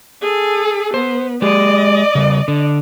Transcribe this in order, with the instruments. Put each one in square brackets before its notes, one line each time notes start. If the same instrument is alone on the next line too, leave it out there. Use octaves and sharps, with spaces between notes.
[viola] G#4 A4
[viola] B3 [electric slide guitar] C5
[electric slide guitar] G#3 G4 G#4 [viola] D5 D#5
[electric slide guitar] C#3 G3
D3